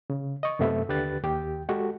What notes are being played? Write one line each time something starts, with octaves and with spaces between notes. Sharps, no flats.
C#3
D#5 C#6
F#2 C3 A3 B3 E5
D#2 D3 G4 B4 F#6 A6
D#2 G4 G5
G#3 F#4 G4 A4